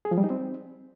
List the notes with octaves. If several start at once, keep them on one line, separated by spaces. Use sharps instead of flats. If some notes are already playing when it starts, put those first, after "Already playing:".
G#4
F3
G3
D#4
C4